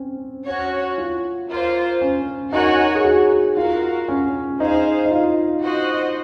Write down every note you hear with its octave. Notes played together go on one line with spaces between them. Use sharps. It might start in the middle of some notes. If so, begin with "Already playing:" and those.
Already playing: C4 C#4
C#4 F#4 C#5
F4
A#3 F4 C5
C#4
D#4 F#4 A#4 C#5 G#5
G#4
F#4
F4 F#4 A#4 F5
C#4
D#4 G#4 C5 F5
D#4
F4
F#4 C5 D#5